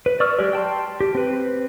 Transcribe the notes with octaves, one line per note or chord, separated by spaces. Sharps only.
B4
D5 C#6 E6 F6
F#3 G#3 G4 D5
G5 A5 C6
G4
C4 B4